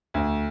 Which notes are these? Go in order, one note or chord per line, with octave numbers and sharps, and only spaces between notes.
D2